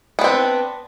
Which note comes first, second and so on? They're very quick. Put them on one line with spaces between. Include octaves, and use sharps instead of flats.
B3 D4 C4